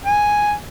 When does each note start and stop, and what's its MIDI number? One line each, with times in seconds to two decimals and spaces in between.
0.05 0.53 80